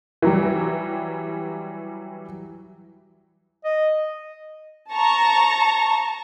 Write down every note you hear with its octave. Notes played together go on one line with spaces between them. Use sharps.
E3 F#3 G3
D#5
A5 A#5 C#6